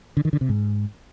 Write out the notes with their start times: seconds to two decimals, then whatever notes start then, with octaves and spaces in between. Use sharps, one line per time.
0.17 D3
0.25 D#3
0.33 D3
0.41 C3
0.49 G#2